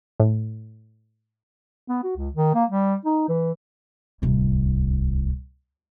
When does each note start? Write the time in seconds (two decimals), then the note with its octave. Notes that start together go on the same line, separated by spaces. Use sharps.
0.20 A2
1.88 B3
2.04 F#4
2.16 C#2
2.35 D#3
2.54 A#3
2.70 G3
3.05 D#4
3.29 E3
4.22 D1 C2